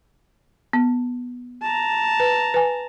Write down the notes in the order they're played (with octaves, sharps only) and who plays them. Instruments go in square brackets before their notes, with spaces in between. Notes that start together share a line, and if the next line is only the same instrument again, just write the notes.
[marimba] B3
[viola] A5 A#5
[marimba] B4
B4 G#5